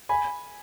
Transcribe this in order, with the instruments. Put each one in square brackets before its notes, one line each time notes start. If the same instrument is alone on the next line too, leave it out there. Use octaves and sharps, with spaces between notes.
[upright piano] G#5 B5